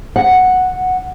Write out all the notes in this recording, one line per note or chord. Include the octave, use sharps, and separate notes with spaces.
F#5